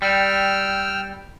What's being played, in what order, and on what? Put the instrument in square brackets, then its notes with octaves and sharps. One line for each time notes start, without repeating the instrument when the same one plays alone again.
[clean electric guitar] G3 [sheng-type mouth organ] G5 E6 F6